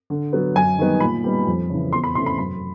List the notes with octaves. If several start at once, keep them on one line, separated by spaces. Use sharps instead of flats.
D3
F#3 B3
F#2 G#5
D#3 G3 B3 D#4
A#2 B5
G3 B3 D#4
F2
C#3 E3
E2 C6
B5
C3 E3 A3 C#4 C6
B5
F#2 B5